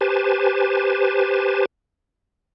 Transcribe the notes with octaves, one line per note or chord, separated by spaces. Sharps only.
G4 B4 C5 G#5 A5